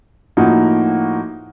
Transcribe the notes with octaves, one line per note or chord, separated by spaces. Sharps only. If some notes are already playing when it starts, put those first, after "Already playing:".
A2 F3 A#3 D#4 F#4